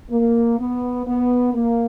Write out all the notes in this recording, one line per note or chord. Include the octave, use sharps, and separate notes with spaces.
A#3
B3
B3
A#3